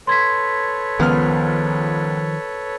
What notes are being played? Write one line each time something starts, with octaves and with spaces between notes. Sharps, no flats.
A4 B4 C#5 C6 G#6 B6
C#2 D#3 F3 B3 F6